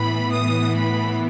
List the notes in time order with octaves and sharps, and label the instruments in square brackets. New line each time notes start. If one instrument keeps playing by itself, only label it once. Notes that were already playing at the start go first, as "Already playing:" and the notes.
Already playing: [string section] A2 E3 B3 B5
D#6
B5